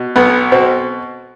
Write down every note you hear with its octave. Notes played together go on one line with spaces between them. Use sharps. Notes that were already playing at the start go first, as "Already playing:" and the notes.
Already playing: B2
B1 B3
B2 C4